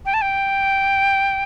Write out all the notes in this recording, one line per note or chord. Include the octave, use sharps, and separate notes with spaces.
G5
A5
G5